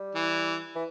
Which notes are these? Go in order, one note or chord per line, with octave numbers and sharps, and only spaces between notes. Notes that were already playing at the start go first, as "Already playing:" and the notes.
Already playing: G3
E3
E3